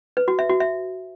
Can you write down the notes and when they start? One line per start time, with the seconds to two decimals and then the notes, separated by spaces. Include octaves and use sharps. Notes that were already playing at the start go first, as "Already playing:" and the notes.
0.17 B4
0.28 F#4
0.39 E5
0.50 F#4
0.60 E5